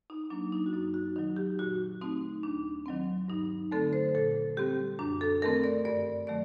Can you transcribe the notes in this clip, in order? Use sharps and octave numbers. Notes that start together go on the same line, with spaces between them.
D#4
F#3 A#3 D4
D#4
F#4
F#2 D#4
F#4
D#3 F#3 D#4
G4
A#2 F#4
A3 C4 D#4
D#2 D4
D#3 F#3 C4
G2 D#4
D3 A3 C4 A4
C5
A#2 A4
G3 C4 G4
F#2 D4
A4
D#3 A3 C4 A#4
D5
G2 D5
D#3 F#3 A3 D5